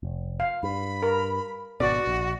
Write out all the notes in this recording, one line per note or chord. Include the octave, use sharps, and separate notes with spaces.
F1
F5
G2 B5
A#4
G#1 B2 F#4 D5
A#1